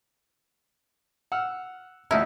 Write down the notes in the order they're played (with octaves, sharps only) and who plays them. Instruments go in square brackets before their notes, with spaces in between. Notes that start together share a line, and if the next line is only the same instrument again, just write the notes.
[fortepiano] F#5 E6 F6
[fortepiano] A1 D2 [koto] D#4 E4